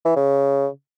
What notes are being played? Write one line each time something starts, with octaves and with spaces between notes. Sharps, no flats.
E3
C#3